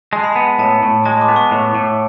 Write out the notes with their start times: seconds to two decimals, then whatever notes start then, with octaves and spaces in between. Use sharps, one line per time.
0.12 G#3 A5
0.24 B5
0.35 B3 A5
0.58 A2 A5
0.82 A2
1.05 G#3 A5
1.21 D6
1.28 B3
1.36 C#6
1.51 A2
1.75 A2